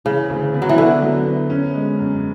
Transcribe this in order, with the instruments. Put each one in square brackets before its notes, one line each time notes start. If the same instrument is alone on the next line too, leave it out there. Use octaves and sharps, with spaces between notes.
[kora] C#3 [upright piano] E3
[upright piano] D2
B3
[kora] F#3
E3
[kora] D3 [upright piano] B3
[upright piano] F#3
B3
C#4
G#3
F#2